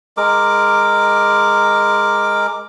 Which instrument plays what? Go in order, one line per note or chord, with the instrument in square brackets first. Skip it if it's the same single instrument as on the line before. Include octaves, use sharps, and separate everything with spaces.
[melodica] G#3 A#4 D6